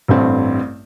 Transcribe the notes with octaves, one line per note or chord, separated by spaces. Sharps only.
A1 G2 A3 C4